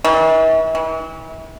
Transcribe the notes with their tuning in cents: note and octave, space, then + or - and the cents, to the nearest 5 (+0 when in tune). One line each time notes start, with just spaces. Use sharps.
E3 -45
E3 -35